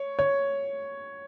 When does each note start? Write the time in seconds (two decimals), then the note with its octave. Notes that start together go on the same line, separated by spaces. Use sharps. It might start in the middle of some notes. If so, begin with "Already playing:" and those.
Already playing: C#5
0.19 C#5